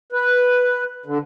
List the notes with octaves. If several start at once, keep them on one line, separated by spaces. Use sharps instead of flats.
B4
D3